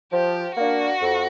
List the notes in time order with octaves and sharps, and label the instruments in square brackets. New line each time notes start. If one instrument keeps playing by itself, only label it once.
[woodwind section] F3 [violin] G4
[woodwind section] A#3 D4 [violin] F#4
[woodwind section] F2